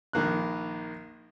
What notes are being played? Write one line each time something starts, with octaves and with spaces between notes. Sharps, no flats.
A#1 D#3 A#3 F#6